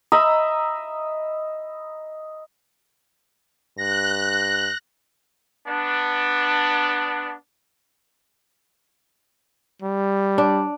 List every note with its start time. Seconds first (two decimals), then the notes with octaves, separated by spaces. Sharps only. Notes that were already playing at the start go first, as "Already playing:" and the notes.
0.12 D#5 E5 A#5 B5
3.77 G2 F#6 A#6
5.68 B3 D4
9.82 G3
10.38 D4